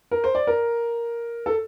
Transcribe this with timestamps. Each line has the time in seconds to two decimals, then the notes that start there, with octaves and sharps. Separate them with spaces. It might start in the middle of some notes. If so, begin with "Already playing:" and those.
0.11 A#4
0.24 C5
0.35 D5
0.47 A#4
1.46 A4